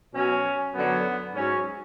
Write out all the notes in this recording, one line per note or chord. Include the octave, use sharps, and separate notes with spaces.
B2 F#3 C#4
F#2 D3 F#3 B3
G#2 F#3 C#4